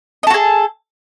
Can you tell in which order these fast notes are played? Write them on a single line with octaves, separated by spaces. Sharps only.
D#5 A4 F#4 G#4